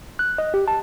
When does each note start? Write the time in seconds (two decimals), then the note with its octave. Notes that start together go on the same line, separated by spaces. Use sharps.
0.19 F#6
0.38 D#5
0.54 G4
0.68 A5